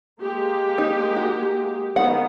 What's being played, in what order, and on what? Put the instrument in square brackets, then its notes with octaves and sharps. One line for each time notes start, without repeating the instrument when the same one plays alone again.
[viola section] G#3 A#3 G4
[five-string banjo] D#4
F#4
[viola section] D#3 G#3 B3 [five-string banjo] F#5